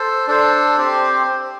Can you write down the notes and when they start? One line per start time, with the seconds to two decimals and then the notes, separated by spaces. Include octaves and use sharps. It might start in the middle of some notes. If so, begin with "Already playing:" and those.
Already playing: A4 C5
0.27 D4 A4 C5
0.78 C4 G4 C5